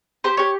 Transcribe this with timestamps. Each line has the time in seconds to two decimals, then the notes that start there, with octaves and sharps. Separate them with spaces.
0.24 G4 C5
0.37 G4 C#5